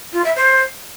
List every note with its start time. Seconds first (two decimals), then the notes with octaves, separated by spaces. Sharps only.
0.13 F4
0.25 E5
0.36 C5